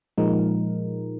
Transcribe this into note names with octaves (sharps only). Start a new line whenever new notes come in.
A#2 F3 G#3 D#4 A#4